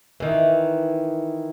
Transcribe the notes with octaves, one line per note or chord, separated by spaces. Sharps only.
D#3 E3